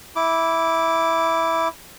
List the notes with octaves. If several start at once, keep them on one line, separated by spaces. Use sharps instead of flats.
E4 D6